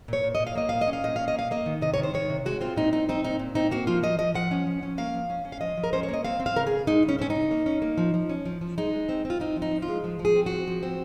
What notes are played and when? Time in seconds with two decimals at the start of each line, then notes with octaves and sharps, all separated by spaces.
0.08 A#2 C#5
0.24 A#2
0.35 D#5
0.40 A#2
0.47 F5
0.55 A#3 D#5
0.69 A#2 F5
0.81 D#5
0.88 C#4
0.93 F5
1.04 A#2 D#5
1.16 C#4 F5
1.28 D#5
1.34 A#3 F5
1.51 A#3 D#5
1.66 D#3
1.82 C3 D#5
1.94 D#3 C#5
2.03 C5
2.14 D#3 C#5
2.30 C3
2.46 G#3 F#4
2.61 C4 F4
2.76 A#2 D#4
2.92 C4 D#4
3.09 C4 D#4
3.24 A#2 D#4
3.39 A#2
3.55 C4 D#4
3.71 A#3 F#4
3.87 F3 F4
4.03 F3 D#5
4.19 F3 D#5
4.34 F3 F#5
4.51 C#4
4.67 F3
4.83 C#4
4.98 A#3 F5
5.14 F3
5.30 C#4
5.45 C#4
5.52 F5
5.61 F3 D#5
5.77 F3
5.84 A#4
5.93 C#4 C5
6.03 C#5
6.09 A#3 D#5
6.25 C4 F5
6.40 C4
6.46 F5
6.56 C#3 A#4
6.67 C#3 G#4
6.87 G#3 D#4
7.03 C#3
7.09 C#4
7.19 C4 C#4
7.30 D#4
7.36 C#3
7.51 A#3
7.66 C#4
7.82 A#3
7.98 F3
8.14 F3
8.29 C#4
8.46 F3
8.61 F3
8.78 G#3 D#4
8.93 G#3
9.09 C4
9.25 C4
9.30 F4
9.40 C4 D#4
9.56 F3
9.62 D#4
9.71 F3
9.82 F4
9.88 G#3
10.04 F3
10.19 F3
10.25 G#4
10.35 C4
10.46 C4 F#4
10.67 F3
10.83 C4